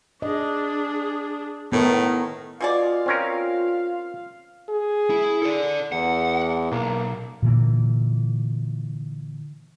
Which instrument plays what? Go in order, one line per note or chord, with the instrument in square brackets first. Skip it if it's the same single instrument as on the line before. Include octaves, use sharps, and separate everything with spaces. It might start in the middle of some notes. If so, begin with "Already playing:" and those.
[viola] D4 G#4 [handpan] D#5
[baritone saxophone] A2 [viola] D#3 [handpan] B3 A#4
[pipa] B2 G#4 D5 [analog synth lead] F4 [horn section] F5
[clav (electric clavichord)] C4 C#4 A#4
[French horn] G#4
[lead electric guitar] E4
A4 D5
[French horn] E2 [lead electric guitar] F#5
[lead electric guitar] B1 [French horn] A#3
[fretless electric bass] A#2 D3 E3 A#3